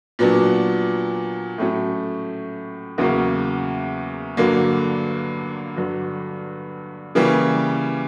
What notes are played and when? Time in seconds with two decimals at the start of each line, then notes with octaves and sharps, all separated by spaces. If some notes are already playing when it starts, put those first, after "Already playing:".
0.19 A#2 F#3 B3 D4
1.58 A2 F#3 A3 C#4
2.98 E2 C#3 F#3 A#3
4.37 G2 D3 F#3 A#3
5.76 G2 D3 F#3
7.15 C#3 E3 G3 A#3